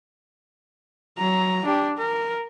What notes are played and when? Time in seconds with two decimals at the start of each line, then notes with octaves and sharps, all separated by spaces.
1.19 F#3 A#5
1.65 D4 G4
1.98 A#4